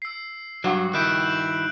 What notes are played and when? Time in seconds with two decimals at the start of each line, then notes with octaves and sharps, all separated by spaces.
0.02 E6 C7
0.64 G2 F#3 F#4
0.94 D#3 E4 F#6 G6 D7
1.21 E7 F#7